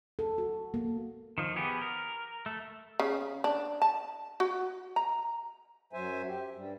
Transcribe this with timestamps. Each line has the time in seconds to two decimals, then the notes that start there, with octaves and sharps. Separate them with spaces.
0.19 A4
0.38 F#4
0.74 A#3
1.38 D#3 F3
1.56 B3 G4 G#4
1.81 A#4
2.46 A3
3.00 C#3
3.44 D4
3.82 A5
4.40 F#4
4.96 A#5
5.93 F#2 F#3 C5 E5 G#5
6.28 G4
6.56 G2 G3